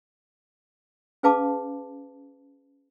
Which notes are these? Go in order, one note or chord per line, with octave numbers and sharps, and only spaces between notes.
C#4 G#4 B4 F5 A5 D6